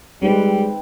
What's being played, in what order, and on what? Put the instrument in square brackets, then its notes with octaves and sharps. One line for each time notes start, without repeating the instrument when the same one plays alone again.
[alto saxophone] G3 [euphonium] G#3 [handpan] C4 D#4 B4